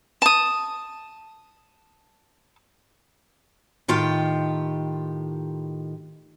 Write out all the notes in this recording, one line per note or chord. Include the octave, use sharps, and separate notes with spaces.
A5 D#6
A2 D#3 F4 G4 G5